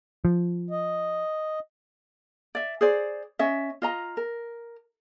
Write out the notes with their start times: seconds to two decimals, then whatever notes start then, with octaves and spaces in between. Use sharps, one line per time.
0.25 F3
0.70 D#5
2.55 D5 E5
2.81 G#4 C5 D5
3.39 C#4 D#5 E5
3.82 F4 D#5 A#5
4.17 A#4